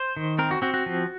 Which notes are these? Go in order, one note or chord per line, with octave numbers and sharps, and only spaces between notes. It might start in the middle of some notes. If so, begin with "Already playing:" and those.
Already playing: C5
D#3
C4 A#4
F#4
C4 F#4
F#4
F3